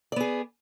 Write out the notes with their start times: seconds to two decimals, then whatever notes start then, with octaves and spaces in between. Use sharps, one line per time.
0.12 D5
0.16 B3
0.20 G#4